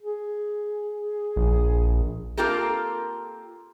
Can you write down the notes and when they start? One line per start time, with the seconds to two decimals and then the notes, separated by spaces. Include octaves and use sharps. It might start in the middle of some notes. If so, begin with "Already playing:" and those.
0.02 G#4
1.36 A#1
2.37 A#3 C4 F4 G4 A4 A#4